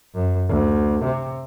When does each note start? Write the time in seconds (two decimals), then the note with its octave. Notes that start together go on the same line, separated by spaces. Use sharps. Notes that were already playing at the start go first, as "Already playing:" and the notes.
0.15 F#2
0.49 D2
1.04 C3